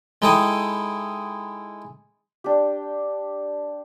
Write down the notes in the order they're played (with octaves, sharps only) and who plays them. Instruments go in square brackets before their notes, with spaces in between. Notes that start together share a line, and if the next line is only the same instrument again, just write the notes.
[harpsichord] G#3 D#4 E4 A4 G5 D#6
[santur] D4 G4